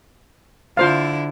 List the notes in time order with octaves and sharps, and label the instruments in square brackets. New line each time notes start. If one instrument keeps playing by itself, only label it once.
[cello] D3 E4 [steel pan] F4 C5 F5